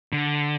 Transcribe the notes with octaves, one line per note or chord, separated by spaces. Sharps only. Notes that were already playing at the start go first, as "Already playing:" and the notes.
D3